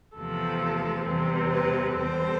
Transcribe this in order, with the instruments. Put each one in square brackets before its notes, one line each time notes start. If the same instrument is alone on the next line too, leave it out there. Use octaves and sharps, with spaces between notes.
[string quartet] E2 C3 F3 A3 A4
E2 C3 E3 G3 C4
B4
E2 C3 G3 C4 A4 C5